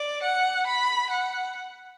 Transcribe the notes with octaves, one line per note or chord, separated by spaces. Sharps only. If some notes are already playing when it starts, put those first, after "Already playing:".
Already playing: D5
F#5
B5
F#5